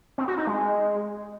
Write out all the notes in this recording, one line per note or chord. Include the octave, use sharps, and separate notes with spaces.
C4
F#4
D#4
G#3